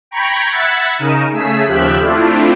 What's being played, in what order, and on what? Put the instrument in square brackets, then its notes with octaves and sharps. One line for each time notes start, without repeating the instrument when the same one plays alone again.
[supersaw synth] G5 A#5 B5 C#6 G#6
E5 F#5 B5 G#6 A6
C#3 D#4 A#4 D#7 E7
C#3 A3 G#4 E6 B6
D#2 C#3 F3 G4 E5 F#6
A3 C4 D4 E4 F4